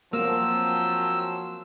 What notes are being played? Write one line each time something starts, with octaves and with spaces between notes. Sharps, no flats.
F3 F#3 A#3 C4 E6